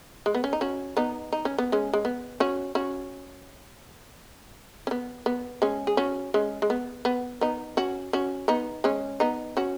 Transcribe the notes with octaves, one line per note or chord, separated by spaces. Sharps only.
G#3
B3
C#4
D#4
C#4 F#4
B3 D#4
D#4
C#4
B3
G#3 C#4
G#3
B3
C#4 F#4
C#4 F#4
C#4
B3
B3
G#3 C#4
G#4
C#4 F#4
G#3 C#4
G#3
B3
B3
B3 D#4
C#4 F#4
C#4 F#4
B3 D#4
G#3 C#4
B3 D#4
C#4 F#4